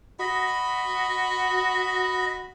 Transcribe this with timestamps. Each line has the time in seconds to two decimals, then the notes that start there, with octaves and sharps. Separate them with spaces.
0.20 F#4 D#5 B5